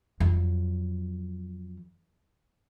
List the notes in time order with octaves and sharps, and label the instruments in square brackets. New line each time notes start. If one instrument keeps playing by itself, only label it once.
[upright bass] F2 F#3